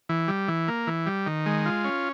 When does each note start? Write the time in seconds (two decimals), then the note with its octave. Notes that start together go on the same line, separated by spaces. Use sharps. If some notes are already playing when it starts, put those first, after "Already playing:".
0.09 E3
0.28 G3
0.48 E3
0.68 A#3
0.87 E3
1.06 G3
1.26 D#3
1.46 G#3
1.66 F4
1.85 C#4